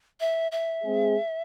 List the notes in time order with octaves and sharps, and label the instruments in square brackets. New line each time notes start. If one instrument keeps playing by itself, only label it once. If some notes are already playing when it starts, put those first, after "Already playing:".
[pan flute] E5
E5
[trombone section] G#3 C4 G#4